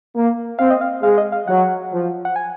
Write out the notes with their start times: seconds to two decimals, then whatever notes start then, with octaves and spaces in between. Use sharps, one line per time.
0.15 A#3
0.59 C4 F5
0.70 D#5
0.81 F5
1.03 G#3 F5
1.18 D#5
1.32 F5
1.47 F#3 F#5
1.92 F3
2.25 F#5
2.36 G#5